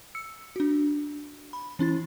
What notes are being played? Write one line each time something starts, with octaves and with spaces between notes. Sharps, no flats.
E6 C#7
D4 F#4
B5
E3 C#4 E4 A6